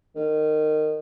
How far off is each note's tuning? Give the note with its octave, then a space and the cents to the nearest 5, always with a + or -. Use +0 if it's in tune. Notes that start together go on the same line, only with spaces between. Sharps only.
D#3 -20